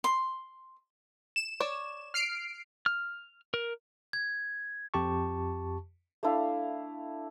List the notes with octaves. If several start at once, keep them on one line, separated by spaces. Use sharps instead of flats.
C6
E7
C#5 D5
F6 C7 D7
F6
A#4
G#6
F2 G4 A5 C#6
A3 D4 E4 F5